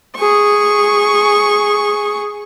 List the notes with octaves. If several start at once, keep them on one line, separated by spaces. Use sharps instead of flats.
G#4 C#6